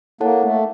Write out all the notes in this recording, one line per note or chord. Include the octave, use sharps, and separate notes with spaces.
A#3 E4 A4 C#5 F#5 A5
A3